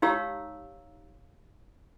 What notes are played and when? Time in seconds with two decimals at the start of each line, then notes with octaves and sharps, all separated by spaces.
0.02 D#4 G4 C#5 F5 A#5 E6